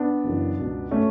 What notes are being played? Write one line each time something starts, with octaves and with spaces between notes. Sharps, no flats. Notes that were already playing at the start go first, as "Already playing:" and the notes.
Already playing: B3 D4
F#1 F#2 C#3 E3
C#2 B2
B2 A3 C#4